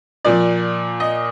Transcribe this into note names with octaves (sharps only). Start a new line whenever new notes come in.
A#2 F3 D5
D#5